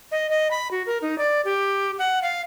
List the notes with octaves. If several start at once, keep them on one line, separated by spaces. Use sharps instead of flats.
D#5
D#5
B5
F#4
A#4
D#4
D5
G4
F#5
F5